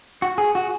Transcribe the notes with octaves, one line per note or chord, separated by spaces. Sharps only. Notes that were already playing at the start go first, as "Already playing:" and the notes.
F#4
G#4
F#4